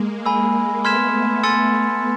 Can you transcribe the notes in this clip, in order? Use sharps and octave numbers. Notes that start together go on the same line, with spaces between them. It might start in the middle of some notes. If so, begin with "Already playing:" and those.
Already playing: G#3 A#3
G#5 B5 E6
A3 B3 C6 F6 G#6 B6 E7
G#5 C6 E6 A6 C#7